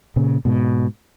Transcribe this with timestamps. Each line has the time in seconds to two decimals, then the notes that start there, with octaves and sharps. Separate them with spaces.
0.16 A#2 C#3
0.45 G#2 B2